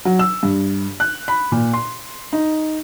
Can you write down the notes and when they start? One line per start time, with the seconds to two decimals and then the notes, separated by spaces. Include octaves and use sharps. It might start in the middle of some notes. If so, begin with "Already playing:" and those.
0.05 F#3
0.19 E6
0.43 G2
1.00 F#6
1.28 B5
1.52 A#2
1.73 C6
2.33 D#4